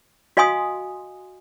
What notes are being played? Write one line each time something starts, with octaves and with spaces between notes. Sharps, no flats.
F#4 D#5 F5 G#5 C6 D#6